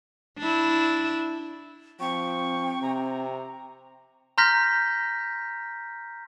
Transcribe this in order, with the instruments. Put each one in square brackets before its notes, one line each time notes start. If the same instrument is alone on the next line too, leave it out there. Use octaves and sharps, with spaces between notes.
[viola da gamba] D4 E4
[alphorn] F3 [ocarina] C4 [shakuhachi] G5 [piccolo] C#6
[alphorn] C3 [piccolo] A#5
[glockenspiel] A#5 C6 F6 G6 A#6 B6